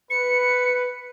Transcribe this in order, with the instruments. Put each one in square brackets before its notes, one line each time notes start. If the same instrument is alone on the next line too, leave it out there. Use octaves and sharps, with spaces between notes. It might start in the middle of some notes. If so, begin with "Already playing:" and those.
[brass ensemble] B4 [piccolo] C#7